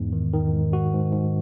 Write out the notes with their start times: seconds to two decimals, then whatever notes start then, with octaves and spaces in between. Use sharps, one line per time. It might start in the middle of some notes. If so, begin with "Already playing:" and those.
Already playing: E2 G#2
0.13 D#3
0.33 D#3
0.53 G#2
0.72 G#2 F#4
0.93 G#2
1.12 G#2